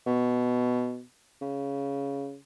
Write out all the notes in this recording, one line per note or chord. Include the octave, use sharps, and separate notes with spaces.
B2
C#3